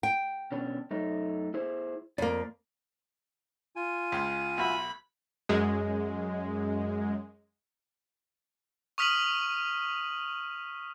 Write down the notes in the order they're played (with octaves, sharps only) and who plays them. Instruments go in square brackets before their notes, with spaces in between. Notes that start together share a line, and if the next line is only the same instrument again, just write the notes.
[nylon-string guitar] G5
[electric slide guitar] B2 C#4 D4
F#2 A3 D#4
E4 G#4 C5
[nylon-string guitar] F2 A#3 [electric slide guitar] D5
[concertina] F4 G#5
[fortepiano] C#2 C6
[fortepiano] B1 F#4 E5 [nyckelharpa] B5
[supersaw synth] F#2 G#3
[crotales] C#6 D#6 F6 B6 D#7 F#7